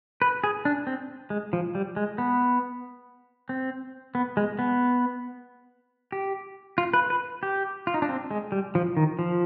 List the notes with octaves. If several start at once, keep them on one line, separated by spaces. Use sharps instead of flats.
B4
G#4
D4
C4
G#3
F3
G3
G#3
B3
C4
B3
G#3
B3
G4
F4
B4
B4
G4
F4
D#4
D4
C4
G#3
G3
F3
D#3
F3